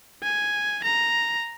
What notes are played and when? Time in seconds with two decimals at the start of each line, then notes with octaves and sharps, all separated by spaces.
0.24 G#5
0.84 A#5